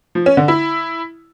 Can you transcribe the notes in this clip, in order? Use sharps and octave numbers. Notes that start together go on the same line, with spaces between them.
F3
C#4
D3
E4